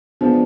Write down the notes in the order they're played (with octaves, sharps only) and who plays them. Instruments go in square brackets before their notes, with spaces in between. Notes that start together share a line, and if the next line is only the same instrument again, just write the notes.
[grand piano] F3 G#3 B3 D4